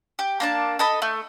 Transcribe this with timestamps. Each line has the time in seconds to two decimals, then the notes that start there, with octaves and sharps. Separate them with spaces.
0.19 G4
0.40 A#3 D4 A5
0.79 A4 D#5 B5
1.02 A3